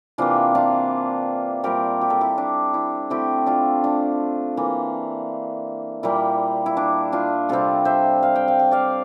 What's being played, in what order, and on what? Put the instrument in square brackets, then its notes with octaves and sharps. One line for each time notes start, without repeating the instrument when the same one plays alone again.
[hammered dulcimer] C3 E3 A#3 D4 F4
D4 F4
A#2 G3 C4 G4 A#4
G4
A4
E4 G4
D4
E4
D3 A3 C4 E4 G4
D4 F4
D4
E3 A#3
A#2 G3 A#3 E4
E4
D4
D4 F4
C3 G3 C4 F4 A4
C5 E5
F5
G5
F5
G5
D5 F5